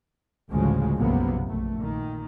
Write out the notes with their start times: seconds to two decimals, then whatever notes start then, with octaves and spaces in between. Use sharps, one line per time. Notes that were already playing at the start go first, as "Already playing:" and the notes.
0.51 A1 D2 C#3 F3 G#3
0.96 B1 F#2 C3 F3 A#3 B3
1.44 A#1 A3
1.76 A#2 D#3